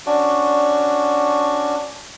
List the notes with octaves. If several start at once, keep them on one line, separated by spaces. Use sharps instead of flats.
C#4 D4 F#4 D5